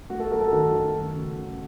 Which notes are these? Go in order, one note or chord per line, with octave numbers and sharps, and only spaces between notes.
A3 F#4
A4
F#2 A#4
A4
D#3 F#4
D#3
A3
C#3
C#3